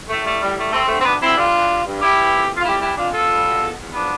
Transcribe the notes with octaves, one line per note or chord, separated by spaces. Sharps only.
A2 A3
G3 A3
A2 G3
G3 A3
G3 A3 C4
D3 A3 C4
C4
D2 B3 D4
D2 C4 E4
G3 D4 F4
E3
G2
G2
G3 E4 G4
E3
F2
F2
F4
G3 E4 G4
E3 E4 G4
F2 D4 F4
F2 F4 A4
G3
B2
E2
E2
F3 B3 D4